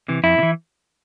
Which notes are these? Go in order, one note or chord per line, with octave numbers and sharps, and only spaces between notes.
C3 E3
F2 E4
C3
E3